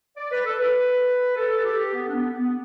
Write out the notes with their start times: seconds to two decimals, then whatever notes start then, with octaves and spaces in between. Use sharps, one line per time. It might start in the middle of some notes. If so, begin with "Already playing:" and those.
0.17 D5
0.32 B4
0.45 A4
0.59 B4
1.36 A4
1.65 G4
1.94 B3
2.08 D4
2.14 B3
2.33 B3